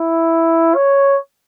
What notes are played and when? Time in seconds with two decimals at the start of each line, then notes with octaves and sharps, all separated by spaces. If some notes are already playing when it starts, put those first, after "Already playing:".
Already playing: E4
0.75 C#5